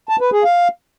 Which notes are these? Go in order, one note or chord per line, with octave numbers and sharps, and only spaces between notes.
A5
B4
G#4
F5